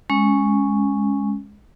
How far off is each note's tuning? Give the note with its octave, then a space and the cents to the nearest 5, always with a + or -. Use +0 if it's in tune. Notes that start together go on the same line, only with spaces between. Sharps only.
G#3 +0 C#4 +0